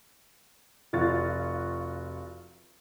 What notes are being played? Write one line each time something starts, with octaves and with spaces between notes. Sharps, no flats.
F1 F4 F#4 A6